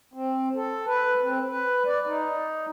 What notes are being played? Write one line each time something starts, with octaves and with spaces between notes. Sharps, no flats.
C4
A4
B4
C4
B4
D5
D#4